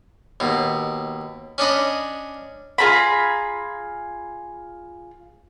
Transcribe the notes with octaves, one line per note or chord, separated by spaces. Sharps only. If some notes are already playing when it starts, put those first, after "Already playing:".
D#2 B2
C#4 D4 D#5 B5
F4 G#4 A#5 B5